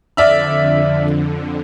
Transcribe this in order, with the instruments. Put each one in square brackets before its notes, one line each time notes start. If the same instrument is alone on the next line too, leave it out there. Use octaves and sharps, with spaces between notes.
[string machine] F2 D3 [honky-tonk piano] D5 E5 F6